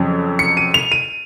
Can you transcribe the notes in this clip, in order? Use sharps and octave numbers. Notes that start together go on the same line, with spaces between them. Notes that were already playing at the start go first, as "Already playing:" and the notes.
Already playing: F2 C#3 F#3
C#7
D#7
F7
D#7